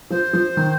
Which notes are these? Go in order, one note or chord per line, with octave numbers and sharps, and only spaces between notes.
F3 C5
F3
D#3